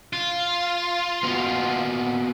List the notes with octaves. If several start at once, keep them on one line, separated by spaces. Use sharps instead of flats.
F4
A#3 B3 F#4